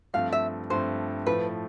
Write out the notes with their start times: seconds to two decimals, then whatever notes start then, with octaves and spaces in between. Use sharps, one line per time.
0.14 G2 F3 A3 C4 F5
0.32 E5
0.70 G2 F3 A3 C4 C5
1.26 A2 F3 A3 B4